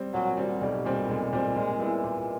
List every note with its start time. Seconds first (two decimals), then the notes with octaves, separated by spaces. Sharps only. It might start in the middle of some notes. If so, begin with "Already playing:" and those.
Already playing: G3 C4
0.13 A#2 F#3
0.37 G3 C4
0.61 B1 G3
0.85 A#2 G3 C4
1.09 B1 G#3
1.33 A#2 G3 C4
1.56 A#2 G#3
1.79 G3 B3 E4
2.04 A#2